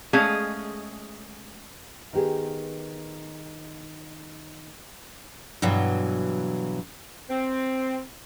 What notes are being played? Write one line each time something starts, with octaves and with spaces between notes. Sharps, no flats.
G#3 A3 C#4 G#4 D#5 F5
D#3 B3 G4 G#4
G2 B2 E3 F#3
C4